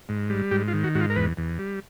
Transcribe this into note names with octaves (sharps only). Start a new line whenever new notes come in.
G#2
G3
G#2 G4
F4
D#3
F#4
G#2 F#4
F4
A#4
E2 B4
E2
G3